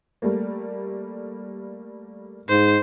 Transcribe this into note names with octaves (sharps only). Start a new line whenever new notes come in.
G3 A3 A#3
G#2 C5